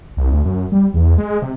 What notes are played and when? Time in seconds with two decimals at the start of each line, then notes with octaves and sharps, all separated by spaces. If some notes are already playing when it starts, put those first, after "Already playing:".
0.17 C2
0.31 D2
0.45 F#2
0.72 G3
0.94 E2
1.18 G#3
1.42 C3